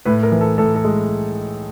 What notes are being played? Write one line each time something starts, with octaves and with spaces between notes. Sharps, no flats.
A2 B4
A#4
E3
A4
A2 A4
A4
G#3